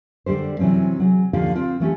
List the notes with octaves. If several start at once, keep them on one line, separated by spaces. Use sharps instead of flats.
D3 G3 G4 C5
C3 E3 F#3 C4 C#4
F#3 G#4
D#2 D3 F3 F4 G4 F5
C4 F4
E3 A3 C#4 G4